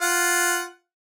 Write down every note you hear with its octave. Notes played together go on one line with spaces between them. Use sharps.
F4 F#5